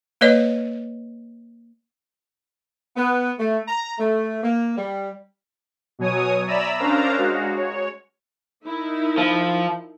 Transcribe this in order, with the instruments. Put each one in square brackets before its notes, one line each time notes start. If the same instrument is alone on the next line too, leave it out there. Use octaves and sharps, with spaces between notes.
[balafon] A#3 B4 C#5 D#5
[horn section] B3
A3
A#5
A3
A#3
G3
[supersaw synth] B2 F#3 C#5 G#5 D#6
D5 E5 A#5 B5 E6
C#4 D4 A#4 C5 F5 A#5
G#3 F#4
C#5
[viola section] D#4 E4 A#4
[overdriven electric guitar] F3